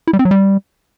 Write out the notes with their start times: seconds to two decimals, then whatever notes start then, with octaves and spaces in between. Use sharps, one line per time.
0.07 E4
0.13 G3
0.19 C4
0.25 F#3
0.31 G3